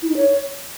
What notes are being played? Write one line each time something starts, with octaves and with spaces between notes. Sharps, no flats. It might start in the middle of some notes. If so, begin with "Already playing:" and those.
E4
D#4
C#5